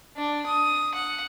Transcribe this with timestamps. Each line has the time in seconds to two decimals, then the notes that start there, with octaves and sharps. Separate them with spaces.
0.17 D4
0.46 D#6
0.95 F#5